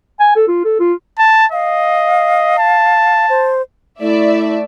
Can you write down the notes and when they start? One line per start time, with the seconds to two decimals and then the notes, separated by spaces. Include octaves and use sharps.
0.20 G#5
0.36 A4
0.48 F4
0.64 A4
0.80 F4
1.19 A5
1.52 D#5 F5
2.59 A5
3.29 C5
4.01 A3 E4 D5 E5